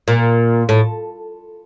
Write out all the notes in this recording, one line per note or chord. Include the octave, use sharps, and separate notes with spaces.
A#2
A2